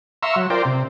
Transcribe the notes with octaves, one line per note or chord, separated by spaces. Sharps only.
E5 F5 A#5 C6 C#6 E6
F#3
F4 A#4 C5 D5 G5
C3